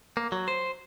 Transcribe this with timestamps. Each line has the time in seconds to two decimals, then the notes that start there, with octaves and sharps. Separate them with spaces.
0.17 A#3
0.32 F#3
0.48 C5